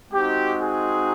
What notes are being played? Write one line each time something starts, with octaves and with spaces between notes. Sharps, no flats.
G#3 C4 D#4 F#4 G4
G#4